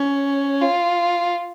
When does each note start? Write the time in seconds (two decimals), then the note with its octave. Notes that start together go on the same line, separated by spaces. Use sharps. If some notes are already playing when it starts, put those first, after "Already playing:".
Already playing: C#4
0.61 F4